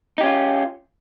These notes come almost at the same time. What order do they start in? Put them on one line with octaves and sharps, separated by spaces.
D#4 G4 C#4 F4